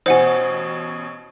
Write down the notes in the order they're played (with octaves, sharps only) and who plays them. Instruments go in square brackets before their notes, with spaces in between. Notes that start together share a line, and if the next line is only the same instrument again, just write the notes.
[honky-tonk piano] A1 B2 [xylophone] C5 F#5 G#5